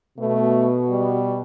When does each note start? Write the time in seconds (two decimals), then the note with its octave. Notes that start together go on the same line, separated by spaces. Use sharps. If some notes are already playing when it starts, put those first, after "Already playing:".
0.19 B2 A3
0.90 G3